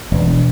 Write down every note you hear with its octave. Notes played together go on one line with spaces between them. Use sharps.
E1